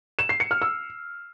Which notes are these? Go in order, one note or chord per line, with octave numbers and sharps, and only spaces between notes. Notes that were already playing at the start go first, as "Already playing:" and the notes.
E7
C7
C#7
F6
E6